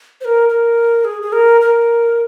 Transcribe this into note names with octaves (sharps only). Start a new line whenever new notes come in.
C5
A#4
A#4
G#4
G#4
A#4
A#4